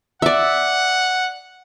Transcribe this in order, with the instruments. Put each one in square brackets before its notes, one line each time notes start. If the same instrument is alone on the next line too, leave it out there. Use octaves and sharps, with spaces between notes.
[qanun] D5 E5 [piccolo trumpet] F#5